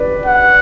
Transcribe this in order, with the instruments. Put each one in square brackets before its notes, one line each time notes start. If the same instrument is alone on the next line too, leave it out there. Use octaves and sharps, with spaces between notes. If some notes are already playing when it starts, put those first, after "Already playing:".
Already playing: [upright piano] B4 D5
[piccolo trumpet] F#5